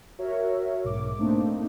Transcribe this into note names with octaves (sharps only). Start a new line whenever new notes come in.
F#4 A#4 C#5 E5
B1 G#2 D6
A3 A#3 C4 D4 D#4